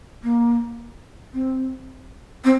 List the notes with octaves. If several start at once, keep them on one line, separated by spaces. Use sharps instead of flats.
A#3
C4
C4